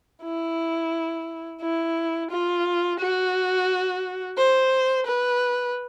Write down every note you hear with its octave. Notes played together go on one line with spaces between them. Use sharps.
E4
E4
F4
F#4
C5
B4